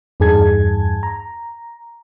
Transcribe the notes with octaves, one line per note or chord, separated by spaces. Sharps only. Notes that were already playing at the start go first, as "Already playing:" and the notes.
E2 G2 D#4 G#4 A5 G#6
A#5